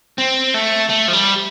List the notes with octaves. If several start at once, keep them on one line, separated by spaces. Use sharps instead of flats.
C4
A3
A3
F3
G3